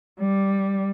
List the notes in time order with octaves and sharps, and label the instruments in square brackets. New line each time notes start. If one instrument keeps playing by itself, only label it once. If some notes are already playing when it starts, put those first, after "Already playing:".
[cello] G3